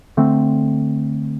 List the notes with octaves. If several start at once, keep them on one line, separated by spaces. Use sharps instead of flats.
D3 A3 C4